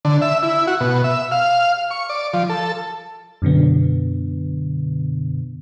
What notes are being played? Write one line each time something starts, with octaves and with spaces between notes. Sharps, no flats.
D3
E5
E4
F#4
B2
E5
F5
C#6
D5
F3
A4
F#2 B2 D3 B3